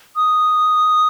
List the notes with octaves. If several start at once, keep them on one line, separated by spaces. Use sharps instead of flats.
D#6